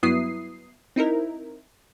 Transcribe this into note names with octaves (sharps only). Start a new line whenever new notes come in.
G2 F#3 B3 E4 D#6 C7
C4 D#4 E4 A#4